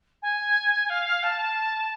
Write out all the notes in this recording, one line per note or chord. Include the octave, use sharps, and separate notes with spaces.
G#5
F5
A5